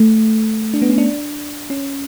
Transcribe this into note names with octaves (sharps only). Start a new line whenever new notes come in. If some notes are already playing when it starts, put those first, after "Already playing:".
Already playing: A3
D4
B3
C#4
D4
C#4